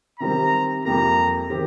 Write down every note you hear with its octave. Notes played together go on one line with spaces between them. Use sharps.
C3 D#3 G3 C4 A#5
F2 C3 G3 A#3 G4 A#5
D#3 C4 G4